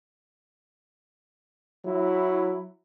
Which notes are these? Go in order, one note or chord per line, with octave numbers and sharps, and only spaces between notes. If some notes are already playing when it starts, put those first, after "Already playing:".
F#3 E4